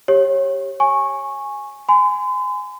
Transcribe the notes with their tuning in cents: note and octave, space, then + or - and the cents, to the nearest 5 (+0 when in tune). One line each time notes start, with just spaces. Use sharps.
G4 +0 C#5 -20
G#5 +0 C#6 -15
G#5 +0 C6 -45